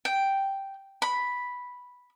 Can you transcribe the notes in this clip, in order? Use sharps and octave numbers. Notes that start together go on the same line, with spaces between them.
G5
B5